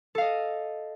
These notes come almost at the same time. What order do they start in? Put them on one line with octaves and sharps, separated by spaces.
A4 F5 D#5